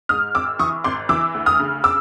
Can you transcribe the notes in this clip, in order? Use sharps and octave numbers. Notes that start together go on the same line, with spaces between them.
G#2 D#6 F6
G#1 D6 E6
E3 C#6 D#6
G#1 C6 D6
E3 D6 E6
D2
D#6 F6
C#3
D6 E6